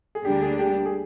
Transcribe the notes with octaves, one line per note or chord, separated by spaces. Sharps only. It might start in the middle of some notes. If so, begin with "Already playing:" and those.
G#4
D2 D3 G3 A#3 D4 G4
G#4
G4
G#4